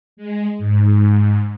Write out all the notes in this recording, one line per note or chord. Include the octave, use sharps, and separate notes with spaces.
G#3
G#2